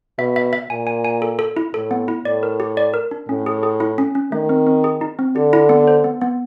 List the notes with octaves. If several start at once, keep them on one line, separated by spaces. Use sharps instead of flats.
B2 E5
E5
E5
A#2 G#5
G#5
G#5
A4
A4
E4
A2 A4
B3
E4
A2 D5
A#4
G4
D5
A#4
D4
A2 C#4
G#4
G#4
E4
C#4
C#4
D#3 A3
C4
C4
G#4
D#4
C4
D3 G4
E4
B3
C5
B3
B3